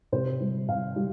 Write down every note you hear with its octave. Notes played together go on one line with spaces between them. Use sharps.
C3 C5
G3
C3 F5
G3